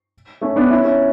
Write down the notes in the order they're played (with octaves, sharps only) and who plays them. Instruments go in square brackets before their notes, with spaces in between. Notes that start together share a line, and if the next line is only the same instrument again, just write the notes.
[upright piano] A3 C#4
B3 D4
C#4 E4
C#4 E4